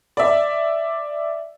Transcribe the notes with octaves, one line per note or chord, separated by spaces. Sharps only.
D5 E5